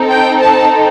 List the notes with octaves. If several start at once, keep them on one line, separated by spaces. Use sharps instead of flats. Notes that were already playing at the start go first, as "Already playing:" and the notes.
Already playing: C4 D#4 A4
G5
A5